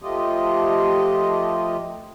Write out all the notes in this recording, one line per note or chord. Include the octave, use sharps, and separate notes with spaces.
F3 A3 F4 G4 D#5